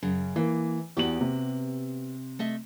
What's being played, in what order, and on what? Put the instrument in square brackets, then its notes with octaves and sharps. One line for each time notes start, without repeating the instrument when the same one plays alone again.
[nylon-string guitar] F#2 C#3
[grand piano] E3 [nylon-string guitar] A#3
[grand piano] E2 F#7 [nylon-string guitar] B3 F#4 G4
[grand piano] C3
[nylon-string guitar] A3 D#5 E5